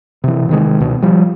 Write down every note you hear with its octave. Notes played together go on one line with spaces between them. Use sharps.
C3 E3
C3 D#3 G#3
C#2 B2
F3 G3